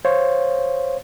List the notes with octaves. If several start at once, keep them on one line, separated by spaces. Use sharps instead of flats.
C5 C#5 F5